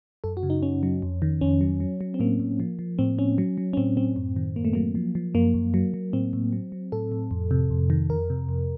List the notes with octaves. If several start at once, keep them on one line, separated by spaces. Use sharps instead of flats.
F#2 A4
F#4
C#3
D#4
F#2 C#4
F#3
F2
D#3
F2 C#4
F#3
F#3
F#3
C4
A2 A#3
A2
F3
F3
A2 C4
A2 C#4
F#3
F#3
C#4
A2 C4
A2 C4
F#2
D#3
F#2 A#3
A3
F#3 A#3
F3
F3
F#2 A#3
F#2
F#3
F#3
A2 C4
A2
F#3
F#3
A2 A4
A2
F2
C3
F2
D#3
F2 A#4
C3
F2